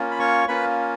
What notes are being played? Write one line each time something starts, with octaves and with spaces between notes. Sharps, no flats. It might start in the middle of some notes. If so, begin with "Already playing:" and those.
Already playing: A#3 C#4 F4
B5
C#5 C#6
A#3 C#4 F4 B4 B5